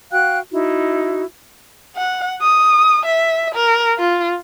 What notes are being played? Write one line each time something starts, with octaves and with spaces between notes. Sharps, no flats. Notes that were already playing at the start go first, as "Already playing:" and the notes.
F#4 F5 G5 F#6
D#4 E4 F#4
F#5
D#6
E5
A#4
F4